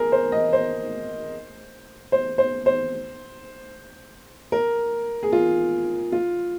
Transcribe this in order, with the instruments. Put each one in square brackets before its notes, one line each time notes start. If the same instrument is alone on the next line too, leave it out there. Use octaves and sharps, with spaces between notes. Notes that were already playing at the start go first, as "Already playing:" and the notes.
Already playing: [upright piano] G#4 A#4
C5
D#5
C5
C5
C5
C5
A#4
G#4
F4
F4